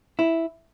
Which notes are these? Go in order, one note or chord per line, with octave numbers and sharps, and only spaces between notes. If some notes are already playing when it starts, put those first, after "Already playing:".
E4